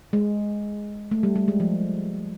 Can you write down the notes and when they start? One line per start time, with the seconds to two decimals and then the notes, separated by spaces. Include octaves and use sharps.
0.13 G#3
1.11 A3
1.23 G3
1.36 G3
1.48 G#3
1.60 F3